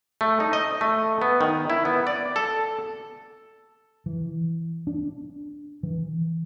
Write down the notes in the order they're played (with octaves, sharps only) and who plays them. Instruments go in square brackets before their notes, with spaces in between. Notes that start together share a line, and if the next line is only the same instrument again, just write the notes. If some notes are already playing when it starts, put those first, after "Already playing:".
[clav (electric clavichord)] A3
D#4
D#5
A3
B3
D#3
E4
B3
D5
A4
[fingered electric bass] E3
D4
E3